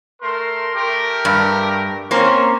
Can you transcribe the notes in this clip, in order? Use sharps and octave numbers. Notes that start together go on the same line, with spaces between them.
A3 A#4 C6
A3 G4 A#4
G2
A#3 C4 C#4 C5